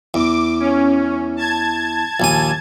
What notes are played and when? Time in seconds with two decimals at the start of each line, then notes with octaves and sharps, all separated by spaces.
0.14 E2 D6
0.60 C#4
1.36 A5 G#6
2.20 A#1 D#2 G#5